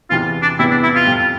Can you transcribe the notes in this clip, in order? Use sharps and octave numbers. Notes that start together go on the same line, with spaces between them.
E2 C3 E3 B3 F4
D4
E2 C3 E3 B3 E4
D4
E4
F4
F2 C3 G3